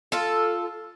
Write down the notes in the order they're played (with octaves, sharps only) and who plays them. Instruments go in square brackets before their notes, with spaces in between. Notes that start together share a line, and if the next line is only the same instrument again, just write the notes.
[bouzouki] F4 A4